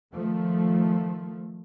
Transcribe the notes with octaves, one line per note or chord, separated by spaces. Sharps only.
D#3 F3 A3